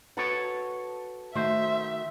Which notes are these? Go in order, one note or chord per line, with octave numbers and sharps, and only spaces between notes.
F#4 A4 B4 C#5 F#5
D#3 A3 F#4 C5 E5